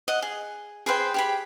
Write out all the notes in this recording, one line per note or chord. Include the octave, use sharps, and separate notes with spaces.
D#5 F#5
G#4
G#4 B4 C5 G5
G4 G#4 B5